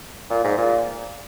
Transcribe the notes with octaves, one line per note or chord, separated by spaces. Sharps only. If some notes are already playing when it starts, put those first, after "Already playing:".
A#2
G#2
A#2